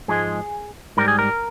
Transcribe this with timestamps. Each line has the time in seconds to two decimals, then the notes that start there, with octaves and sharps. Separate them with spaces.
0.08 G#2 F3 G#3 G#4
0.97 G#2 G3 A#4
1.08 G#4
1.19 A#4